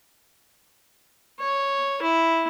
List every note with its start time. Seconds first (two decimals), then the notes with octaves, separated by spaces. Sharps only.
1.39 C#5
2.02 E4